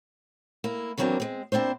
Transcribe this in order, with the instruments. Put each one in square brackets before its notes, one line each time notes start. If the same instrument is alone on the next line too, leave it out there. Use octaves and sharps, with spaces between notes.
[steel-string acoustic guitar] A#3 E4
D#3 E3 F#3 A#3 C4 D4
G#3 C4
A#2 C4 D4 E4 C5